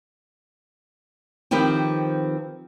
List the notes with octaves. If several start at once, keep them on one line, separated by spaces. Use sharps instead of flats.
D#3 F3 C4 G4 B4